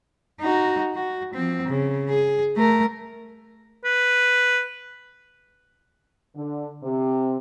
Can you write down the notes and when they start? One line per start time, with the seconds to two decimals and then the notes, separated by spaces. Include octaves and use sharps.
0.41 D#4 F#4
0.95 F#4
1.34 F3 C4
1.67 C#3
2.10 G#4
2.56 A3 A#4
3.85 B4
6.35 D3
6.83 C3